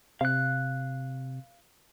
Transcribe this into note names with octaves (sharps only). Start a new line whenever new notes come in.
C3 F5 F#6